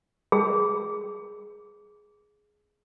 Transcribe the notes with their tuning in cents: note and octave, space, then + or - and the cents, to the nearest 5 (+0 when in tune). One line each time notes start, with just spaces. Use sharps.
G#4 +10